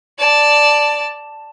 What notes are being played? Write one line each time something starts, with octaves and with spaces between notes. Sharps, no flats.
D5 A5